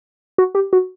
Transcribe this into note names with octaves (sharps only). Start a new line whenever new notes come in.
F#4
G4
F#4